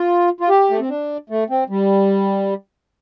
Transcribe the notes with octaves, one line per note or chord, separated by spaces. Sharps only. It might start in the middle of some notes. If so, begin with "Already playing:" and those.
Already playing: F4
F4
G4
A3
C4
D4
A3
C4
G3